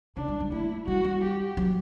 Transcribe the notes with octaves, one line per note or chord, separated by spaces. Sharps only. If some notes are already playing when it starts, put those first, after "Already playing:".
C#3 D4
G3
G3
A3 E4
G3 F#4
G3
G4
F#3